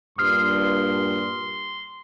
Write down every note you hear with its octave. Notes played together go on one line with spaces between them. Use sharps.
G2 A#2 C6 D#6 F6 C7